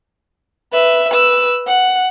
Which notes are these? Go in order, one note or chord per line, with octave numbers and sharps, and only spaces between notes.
B4 E5
B4 E6
F#5